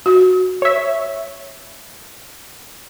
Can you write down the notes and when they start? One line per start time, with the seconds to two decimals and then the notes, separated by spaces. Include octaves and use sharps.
0.06 F#4
0.62 C#5 E5